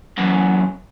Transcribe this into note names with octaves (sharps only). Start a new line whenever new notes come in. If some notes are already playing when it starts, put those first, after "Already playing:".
F#2 E3